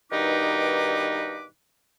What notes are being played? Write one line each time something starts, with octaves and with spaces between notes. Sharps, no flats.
G2 B2 D#3 D#4 B4 D6